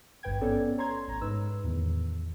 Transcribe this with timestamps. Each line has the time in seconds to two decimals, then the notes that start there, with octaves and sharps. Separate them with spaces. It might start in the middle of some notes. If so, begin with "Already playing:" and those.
0.23 G#1 G2 B4 G5 G#6
0.41 B3 C#4 A4 C#5 D5
0.78 C#5 A#5 C6 G#6
1.07 A1 A#5
1.21 G#2 D#4 B4 E6
1.64 E2 A2 D#3